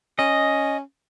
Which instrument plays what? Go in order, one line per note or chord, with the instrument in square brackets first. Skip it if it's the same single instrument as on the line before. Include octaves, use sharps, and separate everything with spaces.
[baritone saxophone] C#4 [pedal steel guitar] D#5